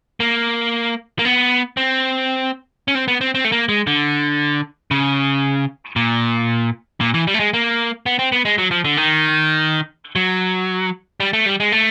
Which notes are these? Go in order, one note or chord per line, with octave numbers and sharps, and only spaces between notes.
A#3
A#3
B3
C4
C#4
C4
B3
C4
C4
A3
A#3
G#3
D3
C#3
A#2
A#2
E3
G3
A3
G#3
A#3
B3
C4
B3
G#3
F#3
F3
D3
D#3
F#3
G3
A3
G3
G#3
A3